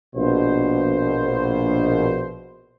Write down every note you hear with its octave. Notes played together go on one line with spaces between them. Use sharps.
A#1 B2 C5